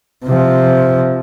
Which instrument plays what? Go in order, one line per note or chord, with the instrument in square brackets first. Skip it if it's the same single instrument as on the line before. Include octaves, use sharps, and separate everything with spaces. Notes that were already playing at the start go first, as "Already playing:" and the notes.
[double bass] C3 F3